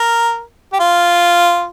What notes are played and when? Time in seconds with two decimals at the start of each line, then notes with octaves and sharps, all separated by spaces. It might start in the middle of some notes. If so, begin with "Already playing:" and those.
Already playing: A#4
0.73 G4
0.80 F4